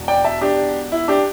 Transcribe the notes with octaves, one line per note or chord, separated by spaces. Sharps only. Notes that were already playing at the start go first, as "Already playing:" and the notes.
Already playing: E1 E2 B2
D5 G5
E5 A5
D4 G4
E4
D4 G4